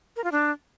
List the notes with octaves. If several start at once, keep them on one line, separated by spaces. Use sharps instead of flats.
A#4
F4
D4